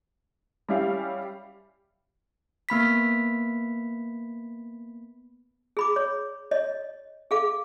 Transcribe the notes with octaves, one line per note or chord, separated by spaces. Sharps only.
G3 C#4 E4 G4 F5
A#3 B3 B5 B6
G#4 B5 D6
C#5
C#5 D#5
G#4 A4 F5 D6